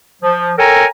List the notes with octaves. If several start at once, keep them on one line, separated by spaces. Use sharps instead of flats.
F3
A4 A#4 C#5 G5 G#5 A#5